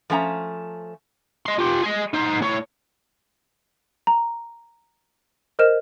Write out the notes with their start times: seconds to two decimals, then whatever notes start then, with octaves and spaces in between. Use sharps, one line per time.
0.10 F3 A3 C#4 F#5 A#5
1.46 D#5 C6
1.59 F4 G4
1.83 G#4 D#5
2.14 D#4 C5
2.42 A2 C#5
4.07 A#5
5.59 A#4 C5 D#5 F6 E7